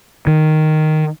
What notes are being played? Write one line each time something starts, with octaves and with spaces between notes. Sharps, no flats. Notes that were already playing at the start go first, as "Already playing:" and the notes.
D#3